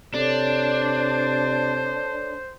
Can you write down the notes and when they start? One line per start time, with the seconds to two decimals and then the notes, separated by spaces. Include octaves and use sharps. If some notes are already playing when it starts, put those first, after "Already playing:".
0.14 C3 D4 A4 C5 C#5